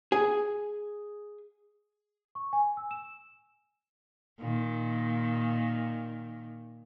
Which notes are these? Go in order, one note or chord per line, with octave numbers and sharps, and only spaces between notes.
G#4
C#6
G#5
E6
E7
A#2 D#3